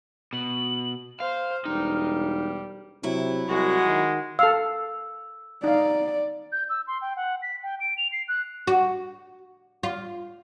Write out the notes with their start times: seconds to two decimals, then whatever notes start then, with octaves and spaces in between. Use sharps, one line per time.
0.33 B2 F#7
1.20 C5 F5 F6
1.65 E1 G3 D#4
3.03 C3 F#3 E4
3.48 C2 G#3 F#4 F#5
3.85 D#3
4.39 A4 F5 E6
5.64 D#4 D5 F5
6.52 G6
6.69 E6
6.87 C6
7.02 G5
7.16 F#5
7.42 B6
7.63 G5
7.80 D7
7.98 F7
8.12 C7
8.28 F#6
8.67 F#4
9.83 F4